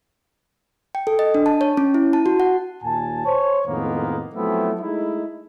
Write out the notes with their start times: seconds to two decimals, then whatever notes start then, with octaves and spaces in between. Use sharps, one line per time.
0.95 G5
1.07 A4
1.19 D#5
1.35 D4
1.46 A5
1.61 C#5
1.77 C#4
1.94 E4
2.13 A5
2.26 F#4
2.40 F#5
2.83 D#2 A#2 G#5 A5
3.26 C5 C#5
3.67 F2 A2 D#3 G#3 A#3 B3
4.35 F3 F#3 A3 B3 C4 E4
4.80 G#3 A3 D#4 E4